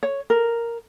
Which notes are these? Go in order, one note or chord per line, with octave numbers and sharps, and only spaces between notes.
C#5
A#4